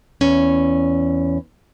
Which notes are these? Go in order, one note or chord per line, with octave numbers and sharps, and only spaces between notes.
E2 C#4